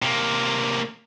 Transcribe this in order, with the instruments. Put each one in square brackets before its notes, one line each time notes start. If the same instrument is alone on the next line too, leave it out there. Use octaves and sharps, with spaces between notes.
[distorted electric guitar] C3 A#3